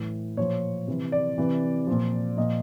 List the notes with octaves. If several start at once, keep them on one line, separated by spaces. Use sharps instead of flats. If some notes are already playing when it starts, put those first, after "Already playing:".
Already playing: A2 E3
A#2 F3 C#5
C3 E3
D5
C3 E3
A#2 F3
A#2 F3 D#5